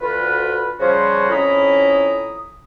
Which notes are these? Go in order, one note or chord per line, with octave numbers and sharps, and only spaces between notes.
D2 F4 B4
C#3 F3 G3 C#4 F#4 C5
F2 C#4 E4 A#5 B5 D#6